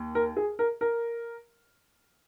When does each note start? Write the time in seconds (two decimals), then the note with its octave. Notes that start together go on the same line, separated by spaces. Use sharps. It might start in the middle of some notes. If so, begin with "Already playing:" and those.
Already playing: D#2
0.15 A#4
0.37 G#4
0.59 A#4
0.81 A#4